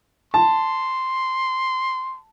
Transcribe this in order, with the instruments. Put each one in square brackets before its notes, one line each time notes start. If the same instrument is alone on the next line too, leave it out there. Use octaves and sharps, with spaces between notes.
[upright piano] A5 [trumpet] C6